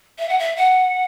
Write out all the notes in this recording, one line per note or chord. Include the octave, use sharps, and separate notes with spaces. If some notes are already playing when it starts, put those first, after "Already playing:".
E5
F#5
E5
F#5